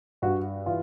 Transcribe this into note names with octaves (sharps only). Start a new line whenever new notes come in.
G2 F#4
E3 F4